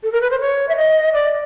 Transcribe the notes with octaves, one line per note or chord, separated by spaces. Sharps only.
A4
A#4
B4
C5
C#5
E5
D#5
D5